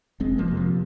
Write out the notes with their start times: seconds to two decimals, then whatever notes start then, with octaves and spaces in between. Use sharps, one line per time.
0.20 F1 G#3 C4
0.38 F3 A#3
0.48 F2 C3
0.57 F3